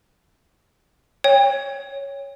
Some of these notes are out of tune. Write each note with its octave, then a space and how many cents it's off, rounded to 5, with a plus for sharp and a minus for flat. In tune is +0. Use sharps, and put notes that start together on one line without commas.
C#5 +0 G5 +40